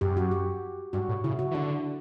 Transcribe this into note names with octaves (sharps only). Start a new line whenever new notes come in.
F#2 G4
F#4
G4
G2 F#4
A2
C#3 E4
F#4
E3
D3 D4